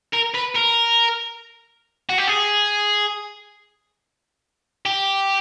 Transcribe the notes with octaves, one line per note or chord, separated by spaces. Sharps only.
A#4
B4
A#4
F#4
G4
G#4
G4